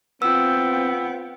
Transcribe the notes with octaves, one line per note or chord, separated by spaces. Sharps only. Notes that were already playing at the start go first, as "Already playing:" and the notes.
B3 C4 F4 G5 E6